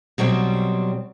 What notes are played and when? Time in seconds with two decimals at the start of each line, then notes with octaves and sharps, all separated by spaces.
0.18 B2 F#3 G3 C4